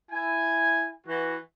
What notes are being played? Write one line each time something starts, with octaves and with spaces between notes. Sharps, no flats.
E4 G#5
E3 F#4